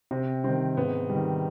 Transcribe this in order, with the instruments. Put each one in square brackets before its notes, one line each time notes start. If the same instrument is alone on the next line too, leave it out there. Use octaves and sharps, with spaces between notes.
[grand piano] C3 [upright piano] C4
[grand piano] D#3 G3 [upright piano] C4
[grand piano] G#2 [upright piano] B3
[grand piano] G3
D#3